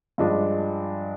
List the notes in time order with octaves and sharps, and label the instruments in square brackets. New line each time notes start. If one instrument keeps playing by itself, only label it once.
[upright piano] G2 F3 G#3 D4